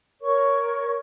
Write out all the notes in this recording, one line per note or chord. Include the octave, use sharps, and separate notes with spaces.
A#4 C#5 C#6